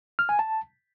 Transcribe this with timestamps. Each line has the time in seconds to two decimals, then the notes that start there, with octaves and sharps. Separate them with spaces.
0.19 F6
0.29 G#5
0.39 A5